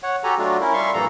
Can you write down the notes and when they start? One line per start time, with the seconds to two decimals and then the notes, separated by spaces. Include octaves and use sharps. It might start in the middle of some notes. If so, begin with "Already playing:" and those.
0.03 C#5 F#5
0.24 F#4 G4 A4 G#5 A#5
0.38 F#3 A3 D4 F4 F#4
0.61 C#4 E4 A#4
0.73 G3 E5 F5 C6 C#6
0.94 G2 A#2 E3 F3 A4 A#5